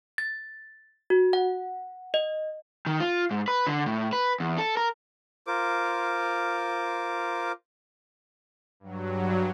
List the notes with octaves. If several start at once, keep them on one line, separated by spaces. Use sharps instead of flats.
A6
F#4
F#5
D#5
D#3
F4
G#2
B4
D3
A2
B4
E2
A4
A#4
F4 A#4 C5 D6
G2 F#3